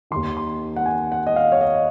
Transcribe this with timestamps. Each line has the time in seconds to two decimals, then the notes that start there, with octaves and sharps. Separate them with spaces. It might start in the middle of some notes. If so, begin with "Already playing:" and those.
0.11 D#3 C6
0.16 D#2
0.37 C6
0.76 F#5
0.86 G#5
1.12 F#5
1.27 D#5
1.36 F5
1.52 C#5
1.61 D#5